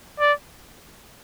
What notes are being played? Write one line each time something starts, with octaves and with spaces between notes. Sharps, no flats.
D5